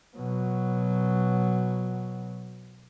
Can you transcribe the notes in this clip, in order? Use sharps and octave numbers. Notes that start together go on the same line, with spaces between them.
B2 F#3